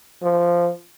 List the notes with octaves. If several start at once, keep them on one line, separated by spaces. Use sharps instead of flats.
F3